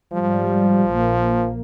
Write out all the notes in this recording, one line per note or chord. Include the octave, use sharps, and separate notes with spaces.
G#2 F3 G3
A#1 A#3